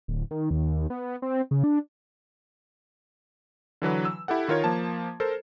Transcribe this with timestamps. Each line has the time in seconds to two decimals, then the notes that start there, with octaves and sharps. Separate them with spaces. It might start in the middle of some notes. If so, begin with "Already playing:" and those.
0.08 D1
0.31 D#3
0.51 D#2
0.90 B3
1.22 C4
1.51 C#3
1.64 D4
3.82 D3 E3 F#3 B4
4.05 E6
4.28 E4 G4 A4 F#5
4.48 D#3 F4 A#4 C#5 G#6
4.64 F3 A#3 A5
5.20 A4 A#4 C5